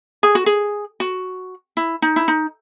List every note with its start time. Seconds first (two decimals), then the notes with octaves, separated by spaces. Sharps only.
0.23 G#4
0.35 F#4
0.46 G#4
1.00 F#4
1.77 E4
2.02 D#4
2.16 E4
2.28 D#4